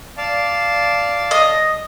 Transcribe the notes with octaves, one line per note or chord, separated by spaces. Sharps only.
D5 F5 A5
D#5